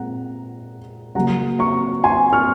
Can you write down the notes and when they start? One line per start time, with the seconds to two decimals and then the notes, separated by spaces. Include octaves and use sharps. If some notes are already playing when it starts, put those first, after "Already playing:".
Already playing: A#2 G#3 C4 F#5 A#5
1.15 C#3 F#3 A#3 F#5 A#5
1.59 A#5 C#6
2.04 G#5 C6
2.33 C#6 F6